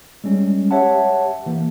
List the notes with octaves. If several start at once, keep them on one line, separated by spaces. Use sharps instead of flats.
G3 G#3 C#4
G4 C#5 E5 F#5 A5
E3 A#3